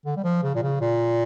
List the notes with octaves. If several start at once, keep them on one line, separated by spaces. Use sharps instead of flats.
D3
G3
F3
C#3
A#2
C#3
A#2